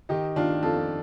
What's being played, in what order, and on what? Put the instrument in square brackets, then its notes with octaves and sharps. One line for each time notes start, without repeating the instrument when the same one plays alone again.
[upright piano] D#3 D#4 G4
D#3 D4 F4
F2 F4 A4